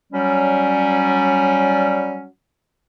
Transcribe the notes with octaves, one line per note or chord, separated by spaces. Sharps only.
F#3 G3 C#4